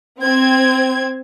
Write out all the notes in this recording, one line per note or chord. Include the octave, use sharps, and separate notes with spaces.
C4 G#6